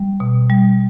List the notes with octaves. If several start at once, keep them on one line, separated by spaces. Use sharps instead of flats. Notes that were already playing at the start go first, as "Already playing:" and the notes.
Already playing: G3
B2
G3